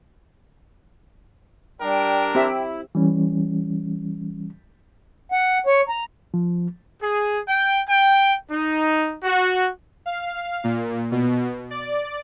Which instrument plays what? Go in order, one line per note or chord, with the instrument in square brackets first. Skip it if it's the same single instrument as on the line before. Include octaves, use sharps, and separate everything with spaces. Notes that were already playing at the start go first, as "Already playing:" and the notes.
[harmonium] G3 [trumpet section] D4 A#4 [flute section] G5
[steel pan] C4 G4 E5 [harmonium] E4
[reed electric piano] E3 G3 C#4
[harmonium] F#5
C#5
A#5
[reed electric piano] F3
[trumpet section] G#4
G5
G5
D#4
F#4
[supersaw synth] F5
A#2
B2
D5